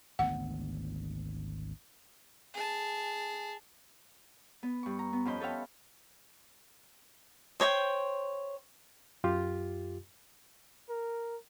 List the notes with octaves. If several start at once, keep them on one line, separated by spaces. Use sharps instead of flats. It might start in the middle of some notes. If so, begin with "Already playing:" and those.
G#1 D2 B3 F#5
G#4 A5
B3
G2 C#6
A#5
B3
F2 C#4 C5 D#5 B5 G6
A4 B4 C#5 E5 F5 G5
C5 C#5 D#5 G5
F#2 F4 G4
A#4